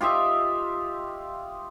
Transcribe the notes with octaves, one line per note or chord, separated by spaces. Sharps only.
F4 G4 D#5 E5